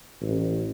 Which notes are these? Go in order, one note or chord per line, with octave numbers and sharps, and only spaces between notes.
A1